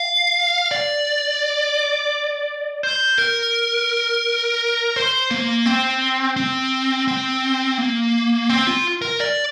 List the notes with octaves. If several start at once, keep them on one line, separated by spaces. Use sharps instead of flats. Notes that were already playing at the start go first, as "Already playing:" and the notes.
Already playing: F5
D5
C5
A#4
C5
A#3
C4
C4
C4
A#3
C4
F4
A#4
D5